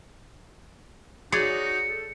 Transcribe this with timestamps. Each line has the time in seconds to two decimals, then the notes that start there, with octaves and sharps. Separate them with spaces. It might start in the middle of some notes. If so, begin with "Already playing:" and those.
1.32 D#4 F#4 G#4 C#5 D5 C#7
1.87 A4